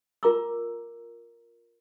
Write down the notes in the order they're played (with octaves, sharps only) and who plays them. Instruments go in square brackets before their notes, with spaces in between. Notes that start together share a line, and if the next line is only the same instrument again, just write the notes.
[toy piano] F4 A#4 A#5 D6 E6